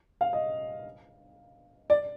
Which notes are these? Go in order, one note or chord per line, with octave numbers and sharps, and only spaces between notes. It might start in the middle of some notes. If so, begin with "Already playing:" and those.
F5
D#5
D5